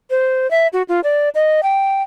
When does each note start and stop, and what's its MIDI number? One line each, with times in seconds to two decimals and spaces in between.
0.10 0.50 72
0.51 0.68 76
0.73 0.83 66
0.88 1.01 65
1.04 1.29 74
1.35 1.61 75
1.63 2.03 79